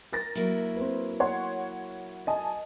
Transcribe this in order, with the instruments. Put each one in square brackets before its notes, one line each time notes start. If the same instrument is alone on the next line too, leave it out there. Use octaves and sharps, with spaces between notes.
[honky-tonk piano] A#4 A6 A#6
[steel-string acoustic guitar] F#3 A#3 E4
[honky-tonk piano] C4 B4
C#5 F#5 C6
D#5 G#5 A5